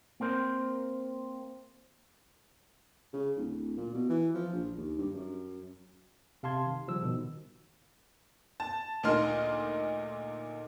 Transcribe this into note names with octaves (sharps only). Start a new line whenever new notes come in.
A#3 C4 A#4 C5
C#3
D1
A#2
B2
E3
F3
A#1
D#2
G2
F#2
C3 F5 A5 C6 G#6
D#3
C#3 F3 G3 E6
B2 D#3
A5
D2 A#2 A#3 D#4 C6 F6